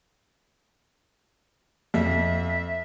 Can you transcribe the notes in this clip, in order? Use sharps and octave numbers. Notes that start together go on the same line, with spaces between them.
F2 E5